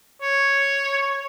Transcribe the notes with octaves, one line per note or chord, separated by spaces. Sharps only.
C#5